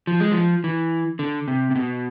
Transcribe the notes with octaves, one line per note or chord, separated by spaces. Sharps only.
F3
G#3
F3
E3
D3
C3
C3
B2